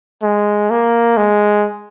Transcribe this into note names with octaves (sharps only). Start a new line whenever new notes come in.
G#3
A#3
G#3